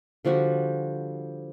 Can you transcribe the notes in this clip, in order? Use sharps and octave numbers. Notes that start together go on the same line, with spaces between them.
D3 F3 G3 F#4